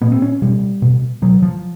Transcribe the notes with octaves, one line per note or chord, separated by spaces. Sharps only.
A#2 B3
C4
C#4
B2 G3
B2
B2 F#3
F3